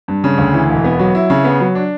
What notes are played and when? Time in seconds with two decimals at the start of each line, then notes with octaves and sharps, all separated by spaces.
0.08 G2
0.24 C#3
0.38 D2
0.54 E3
0.69 E1
0.84 B3
0.99 F#3
1.15 E4
1.30 C#3
1.44 B3
1.60 F#3
1.75 D4